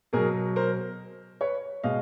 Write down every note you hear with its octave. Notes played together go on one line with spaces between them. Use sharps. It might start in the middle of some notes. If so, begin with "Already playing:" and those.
B2 F#3 G#4 A#4
A#4 C5
B4 C#5
B2 G#3 D#5 F5